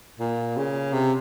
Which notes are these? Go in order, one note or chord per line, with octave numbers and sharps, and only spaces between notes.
A#2
C#3
C3